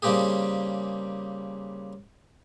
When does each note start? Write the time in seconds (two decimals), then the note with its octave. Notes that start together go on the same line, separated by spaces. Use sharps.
0.02 C#3 G3 A#3 C4 G4 G#4